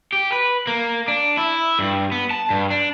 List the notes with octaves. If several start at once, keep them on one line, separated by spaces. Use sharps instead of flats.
G4
B4
A#3
D4
E4
G2
B3
A5
G2
D4